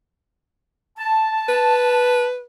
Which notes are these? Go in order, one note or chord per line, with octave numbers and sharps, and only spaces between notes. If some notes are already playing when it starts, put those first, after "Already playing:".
A5
B4